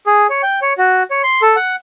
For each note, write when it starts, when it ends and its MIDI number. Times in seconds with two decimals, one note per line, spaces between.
0.06 0.27 68
0.30 0.42 73
0.43 0.60 79
0.62 0.73 73
0.78 1.03 66
1.11 1.22 73
1.23 1.41 84
1.42 1.56 69
1.56 1.76 78